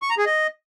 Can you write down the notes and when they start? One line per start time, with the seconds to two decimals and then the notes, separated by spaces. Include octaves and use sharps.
0.02 C#6
0.10 A#5
0.18 G#4
0.26 D#5